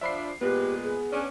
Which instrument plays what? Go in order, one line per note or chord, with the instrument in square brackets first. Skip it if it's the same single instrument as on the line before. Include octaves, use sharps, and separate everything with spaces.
[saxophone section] F3 D4 [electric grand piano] E5 B5 C7
[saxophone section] A#2 G#3 B4 [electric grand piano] B3 [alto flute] G4
[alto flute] G#4
[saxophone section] C#4 D4